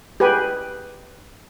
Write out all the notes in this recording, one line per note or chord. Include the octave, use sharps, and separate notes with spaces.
G4 G#4 B4 G#5